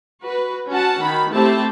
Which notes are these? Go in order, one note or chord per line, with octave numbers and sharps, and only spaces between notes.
F#4 B4
C#4 F#4 F#5 A5
D#3 B5
A3 C4 E4 G4 C5 A5